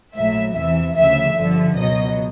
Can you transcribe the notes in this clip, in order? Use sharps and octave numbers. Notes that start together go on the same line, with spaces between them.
A#1 A2 F#3 E5
E2 C3 E3 E5
D2 C#3 F3 E5
G1 G2 D3 F3 E5
C#2 B2 F#3 D#5